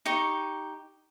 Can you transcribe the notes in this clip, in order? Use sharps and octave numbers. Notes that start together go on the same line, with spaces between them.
D#4 G4 C#6